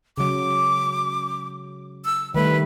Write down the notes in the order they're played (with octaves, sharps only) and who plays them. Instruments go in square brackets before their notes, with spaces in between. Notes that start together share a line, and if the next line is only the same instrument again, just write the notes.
[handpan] C#3 F#3 [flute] D6
[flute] E6
[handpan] D#3 G3 A3 [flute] B4